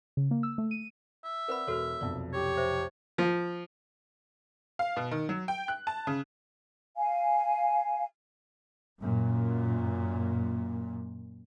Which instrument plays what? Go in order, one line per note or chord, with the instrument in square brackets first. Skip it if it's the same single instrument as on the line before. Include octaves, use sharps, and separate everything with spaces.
[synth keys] C#3
A#3
E6
A3
D#7
[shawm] E5
[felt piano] C4 D5 F#5 [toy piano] A#4 B4 B5
[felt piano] E1 F6 [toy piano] F#4 A4 C#5
[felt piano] F1 B1 F2 [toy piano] D5
[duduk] G4 [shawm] C#5
[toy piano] C5 E5
[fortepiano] F3
[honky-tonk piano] F5
B2
D#3
F#3
G5
F#6
A5
C#3
[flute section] F5 G#5
[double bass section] F#2 A#2